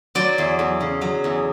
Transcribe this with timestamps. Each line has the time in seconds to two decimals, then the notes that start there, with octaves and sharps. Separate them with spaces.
0.15 F#3 D5
0.38 E2
0.59 E2
0.81 C#3
1.01 F#3
1.24 E2